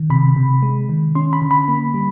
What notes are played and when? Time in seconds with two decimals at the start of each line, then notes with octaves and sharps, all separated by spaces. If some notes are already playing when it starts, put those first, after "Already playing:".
Already playing: D#3
0.10 C3 B5
0.36 C3
0.63 G#3
0.89 D#3
1.15 C#4 C6
1.33 B5
1.42 D3
1.51 B5
1.68 A#3
1.94 G3